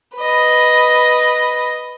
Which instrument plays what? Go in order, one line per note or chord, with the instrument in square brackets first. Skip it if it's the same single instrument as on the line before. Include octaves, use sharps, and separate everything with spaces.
[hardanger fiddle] B4 D#5